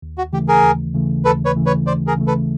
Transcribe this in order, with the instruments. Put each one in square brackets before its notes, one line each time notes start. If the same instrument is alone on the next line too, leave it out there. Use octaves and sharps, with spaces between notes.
[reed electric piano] D#2
[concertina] F#4
[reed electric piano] C#3 E3 A3 [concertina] G4
[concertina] G#4 A#4
[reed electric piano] D#2
C#3 E3 A3
[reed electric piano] D#2 [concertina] A4 B4
[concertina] B4 C#5
[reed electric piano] C#3 E3 A3
[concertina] B4 C#5
[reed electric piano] D#2 [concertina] C5 D5
[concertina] G#4 A#4
[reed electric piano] C#3 E3 A3
[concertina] A4 B4